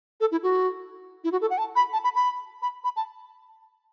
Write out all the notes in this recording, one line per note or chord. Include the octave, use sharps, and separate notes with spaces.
A4
E4
F#4
E4
F#4
A4
F#5
A5
B5
A5
B5
B5
B5
B5
A5